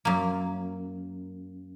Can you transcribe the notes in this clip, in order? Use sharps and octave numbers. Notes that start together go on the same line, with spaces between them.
F#2 A#3